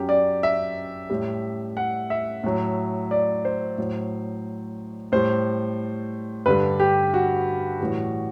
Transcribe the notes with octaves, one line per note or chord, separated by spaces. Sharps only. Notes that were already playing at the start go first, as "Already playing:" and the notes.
Already playing: F#2 F#3 G4
D5
E5
A2 G3
F#5
E5
A2 F#3
D5
C5
A2 F#3
A2 G3 C5
G2 D3 G3 B4
G4
F#4
A2 E3 G3